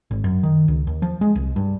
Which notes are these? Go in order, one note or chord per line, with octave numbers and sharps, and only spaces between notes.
G#1
F#2
D#3
C#2
D#2
F3
G#3
C2
G2